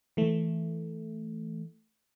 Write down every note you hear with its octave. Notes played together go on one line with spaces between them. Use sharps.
E3 A3